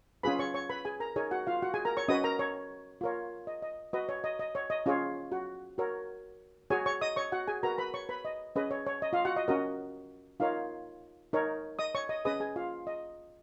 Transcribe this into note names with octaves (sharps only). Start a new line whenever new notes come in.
C#4 F4 G#4 B4 B5
C#5 C#6
C#5 C#6
B4 B5
G#4 G#5
A#4 A#5
D#4 G#4 A#4 C#5 G#5
F#4 F#5
F4 F5
F#4 F#5
G#4 G#5
A#4 A#5
C#5 C#6
C#4 F#4 B4 D#5 D#6
A#4 A#5
C#5
F4 A#4 C#5
D#5
D#5
F#4 B4 D#5
C#5
D#5
D#5
C#5
D#5
C#4 F4 G#4 C#5
F#4 F#5
F#4 A#4 C#5
F#4 G#4 C#5 G#5
C#5 C#6
D#5 D#6
C#5 C#6
F#4 F#5
G#4 G#5
F#4 A#4 B4 A#5
B4 B5
C#5 C#6
B4 B5
D#5
C#4 G#4 B4 D#5
C#5
C#5
D#5
F4 F5
F#4 F#5
D#5
C#4 F#4 A#4 D#5
D#4 F4 A#4 C#5 F5
D#4 A#4 C#5
D#5 D#6
C#5 C#6
D#5 D#6
C#4 G#4 B4 D#5 D#6
G#4 G#5
F4 F5
D#5